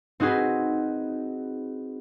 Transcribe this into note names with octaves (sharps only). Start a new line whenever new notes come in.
C4 D#4 F#4 G#4 B4